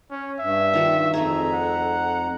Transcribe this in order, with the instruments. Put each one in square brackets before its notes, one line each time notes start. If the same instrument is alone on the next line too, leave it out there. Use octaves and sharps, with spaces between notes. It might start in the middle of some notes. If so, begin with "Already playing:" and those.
[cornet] C#4
[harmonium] G2 [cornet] E5
[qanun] D#3 F4 F#4
[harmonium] F2 A#5 [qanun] A3 D#4 G#4
[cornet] F#5